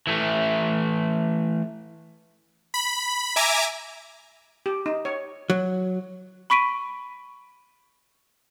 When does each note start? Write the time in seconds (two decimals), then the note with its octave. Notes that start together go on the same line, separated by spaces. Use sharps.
0.07 E3 A3
2.74 B5
3.36 E5 G#5 A#5 D6
4.66 G4
4.86 D#4
5.05 C#5
5.50 F#3
6.50 B5 C#6 B6 D7 D#7